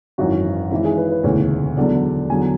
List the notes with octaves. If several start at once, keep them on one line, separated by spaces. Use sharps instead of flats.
G#1 F#2 E3 F#4
G#1 G#2 E3 E4
G#4
B4
B4
E1 D2 C#3 E3 C#5
E1 E2 D3 F#3 D5
E2 D3 F#3 G#5